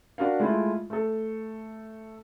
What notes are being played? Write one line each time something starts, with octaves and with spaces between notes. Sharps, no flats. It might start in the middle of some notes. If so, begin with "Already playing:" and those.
D4 F#4 A#4 F5
G#3 A3 E4 F4
A3 A4